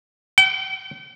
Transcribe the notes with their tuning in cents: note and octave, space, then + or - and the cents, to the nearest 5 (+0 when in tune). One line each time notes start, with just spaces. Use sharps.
G5 -40